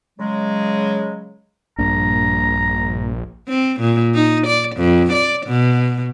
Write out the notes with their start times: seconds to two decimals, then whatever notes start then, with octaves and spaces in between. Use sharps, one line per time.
0.19 C#3 F#3 G#3
1.78 A#1 G2 A#3 D4 A#5
3.48 C4
3.80 A#2
4.14 D#4
4.46 D5
4.76 F2
5.13 D5
5.47 B2